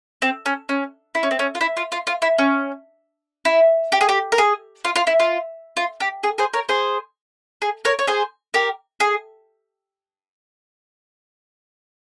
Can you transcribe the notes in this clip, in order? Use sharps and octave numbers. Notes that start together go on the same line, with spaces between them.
C4
C#4
C#4
E4
C#4
C4
C#4
F4
E4
F4
F4
F4
E4
C#4
E4
G4
G#4
G4
A#4
G#4
F4
F4
E4
F4
F4
G4
G#4
G#4 C5
A#4 C#5
G#4 C5
G#4
A#4 C#5
C#5
G#4 C5
G4 A#4
G#4